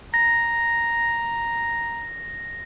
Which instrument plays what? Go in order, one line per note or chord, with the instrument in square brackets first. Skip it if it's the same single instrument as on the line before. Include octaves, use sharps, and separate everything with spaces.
[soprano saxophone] A#5 [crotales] A#6